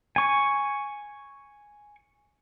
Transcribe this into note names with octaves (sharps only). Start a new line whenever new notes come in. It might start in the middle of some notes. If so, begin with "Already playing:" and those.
G#5 C#6